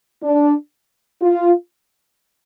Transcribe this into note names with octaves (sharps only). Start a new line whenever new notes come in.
D4
F4